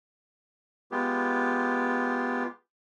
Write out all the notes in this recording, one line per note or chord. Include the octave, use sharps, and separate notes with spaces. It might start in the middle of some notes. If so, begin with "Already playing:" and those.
G#3 B3 F4 G4